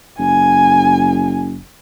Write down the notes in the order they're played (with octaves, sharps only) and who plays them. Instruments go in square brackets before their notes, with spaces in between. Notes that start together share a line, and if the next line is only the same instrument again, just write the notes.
[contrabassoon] F#1 [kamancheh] G#5